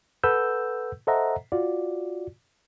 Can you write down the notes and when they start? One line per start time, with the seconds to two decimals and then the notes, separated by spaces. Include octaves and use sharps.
0.24 A4 B4 F#5 E6 G6
1.07 A4 C5 D#5 E5 F#5 A#5
1.52 F4 F#4 D5